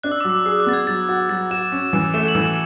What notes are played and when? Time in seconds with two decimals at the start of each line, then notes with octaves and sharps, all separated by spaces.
0.03 D4 F#6
0.12 E6
0.20 D6
0.25 F#3 E6
0.46 G#4 E6
0.60 F#6
0.66 B3 A6
0.73 G#6
0.87 F#3 A6
1.09 F#4
1.29 F#3 A6
1.51 F#4 E7
1.72 C#4
1.93 E3
2.14 A3 E7
2.28 F#7
2.35 E3
2.42 E7